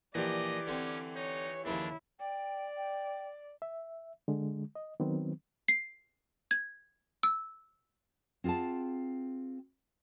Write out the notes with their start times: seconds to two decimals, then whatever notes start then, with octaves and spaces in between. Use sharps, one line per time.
0.15 A#2 E3 F3 G4 D5 D#5
0.67 D3 C4 C#4
1.16 D#4 C#5
1.66 D#2 C#3 F3 D4 E4
2.20 D5 G5
2.77 G5
3.62 E5
4.28 D3 G#3
4.75 D#5
5.00 D#3 F#3 B3 C4
5.68 C7
6.51 G#6
7.23 E6
8.44 C4 F4 G#4 F#5 A5